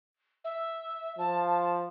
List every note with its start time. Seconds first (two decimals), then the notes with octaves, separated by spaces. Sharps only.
0.44 E5
1.18 F3 A5